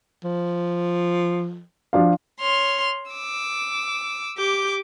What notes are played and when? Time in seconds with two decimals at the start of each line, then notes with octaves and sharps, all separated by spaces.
0.24 F3
1.93 F3 D4 F5
2.40 C#5 C6 F6
3.10 D6 E6
4.36 G4 D6 G6